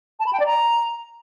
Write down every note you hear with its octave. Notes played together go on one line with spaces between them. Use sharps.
A5
B5
G5
D5
A#5